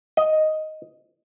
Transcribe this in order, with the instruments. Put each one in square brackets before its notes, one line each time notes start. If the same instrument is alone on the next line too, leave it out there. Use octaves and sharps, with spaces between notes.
[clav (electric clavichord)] D#5